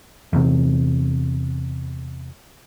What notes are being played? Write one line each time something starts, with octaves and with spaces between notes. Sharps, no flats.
E2 C3